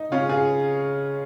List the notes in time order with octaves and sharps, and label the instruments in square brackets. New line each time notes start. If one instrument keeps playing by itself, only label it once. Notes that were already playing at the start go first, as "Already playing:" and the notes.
Already playing: [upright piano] D#4
[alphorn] C#3 [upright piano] C#4 F4
[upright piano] F4 G#4